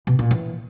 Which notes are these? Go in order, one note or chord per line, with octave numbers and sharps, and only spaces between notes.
B2
A#2
E3